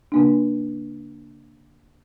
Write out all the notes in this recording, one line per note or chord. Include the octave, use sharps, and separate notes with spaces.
C#3 A#3 D4